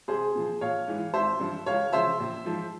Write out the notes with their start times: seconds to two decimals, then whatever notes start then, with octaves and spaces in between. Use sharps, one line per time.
0.08 C2 G#4 C5
0.35 A#2 F3
0.61 A#1 C#5 F5
0.88 G#2 E3
1.14 G#1 C5 E5
1.40 G2 F3
1.66 C#2 C#5 F5
1.92 C#3 F3 C5 E5
2.19 A#1
2.45 G#2 F3